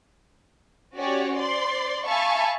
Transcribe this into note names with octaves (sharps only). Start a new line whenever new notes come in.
C#4 F#4 G4 C#5 D5
C5 D5 C6
E5 F5 G#5 A5 B5 C#6